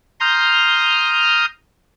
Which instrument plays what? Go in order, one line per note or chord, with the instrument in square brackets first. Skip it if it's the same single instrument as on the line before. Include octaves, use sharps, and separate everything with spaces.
[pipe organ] A#5 C6 D#6 F6 G6